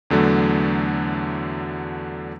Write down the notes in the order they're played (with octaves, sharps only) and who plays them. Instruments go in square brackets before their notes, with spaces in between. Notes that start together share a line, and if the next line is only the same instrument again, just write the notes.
[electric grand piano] E2 D3 F#3 A3